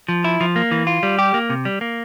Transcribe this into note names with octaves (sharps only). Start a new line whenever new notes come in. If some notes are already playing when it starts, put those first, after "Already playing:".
F3
E4
F3
A#3
E3
F4
G3
G4
A#3
C3
G3
A#3